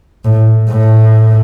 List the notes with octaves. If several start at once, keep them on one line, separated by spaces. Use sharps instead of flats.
A2
A2